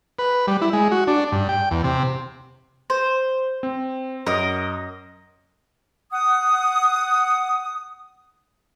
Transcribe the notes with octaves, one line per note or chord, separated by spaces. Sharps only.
B4
G3
E4
G#3
F#4
D4
G2
G5
E2
C3
C5
C4
F#2 A#4 D#5
F#5 D#6